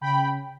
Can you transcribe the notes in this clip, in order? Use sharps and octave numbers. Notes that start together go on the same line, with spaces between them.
C#3 G5 B5